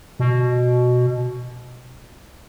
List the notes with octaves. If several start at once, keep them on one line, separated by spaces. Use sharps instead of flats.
B2